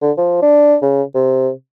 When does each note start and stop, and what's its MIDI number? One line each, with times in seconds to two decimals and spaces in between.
0.02 0.12 50
0.18 0.40 53
0.42 0.76 62
0.82 1.03 49
1.15 1.50 48